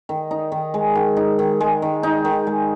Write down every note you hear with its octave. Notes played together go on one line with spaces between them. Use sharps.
D#3
D#4
D#3
G#3
D#3
D#4
D#3
G#3
D#3
D#4
D#3
G#3